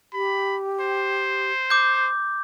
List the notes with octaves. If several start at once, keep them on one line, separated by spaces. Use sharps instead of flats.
G4 B5
C5
D6 G6